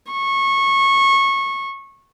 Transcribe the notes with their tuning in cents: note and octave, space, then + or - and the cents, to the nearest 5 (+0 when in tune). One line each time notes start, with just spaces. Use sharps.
C#6 -20